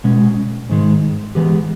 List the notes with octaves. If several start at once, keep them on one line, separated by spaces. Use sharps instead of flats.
B2 G#3 C#4
G#2 D#3 G#3
E3 G#3 B3 G4